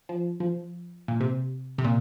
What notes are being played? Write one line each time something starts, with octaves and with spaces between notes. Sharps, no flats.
F3
F3
A#2
C3
C3
A#2